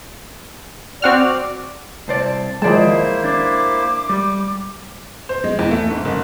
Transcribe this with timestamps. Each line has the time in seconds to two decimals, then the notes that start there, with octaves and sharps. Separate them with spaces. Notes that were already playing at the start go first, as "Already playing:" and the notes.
1.02 C4 F#4 D5 F6
2.08 C2 C5 D5 A5
2.62 D#2 F3 G#3 A#3 E4 C5 D5 A5
3.24 D4 D6
4.09 G3
5.29 C5
5.44 G#3
5.59 E2
5.71 A3
5.91 G#2
6.05 F#1